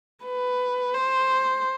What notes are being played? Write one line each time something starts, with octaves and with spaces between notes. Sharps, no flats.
B4
C5